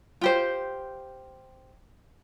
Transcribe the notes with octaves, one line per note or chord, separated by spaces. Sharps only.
F4 G4 C5